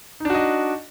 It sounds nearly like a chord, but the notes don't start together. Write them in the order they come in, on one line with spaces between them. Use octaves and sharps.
D#4 D4 F#4 D#5